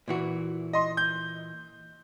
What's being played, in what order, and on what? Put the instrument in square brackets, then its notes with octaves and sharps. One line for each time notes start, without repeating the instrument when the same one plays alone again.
[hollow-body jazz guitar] A#2 E3 F#4
[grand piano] D#5 C6
G6